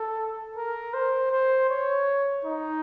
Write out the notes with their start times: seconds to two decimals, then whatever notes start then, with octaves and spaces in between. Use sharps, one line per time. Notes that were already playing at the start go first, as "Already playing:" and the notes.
Already playing: A4
0.56 A#4
0.94 C5
1.31 C5
1.70 C#5
2.45 D#4